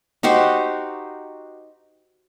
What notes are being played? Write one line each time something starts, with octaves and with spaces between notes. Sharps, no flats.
D#4 F#4 G4 C5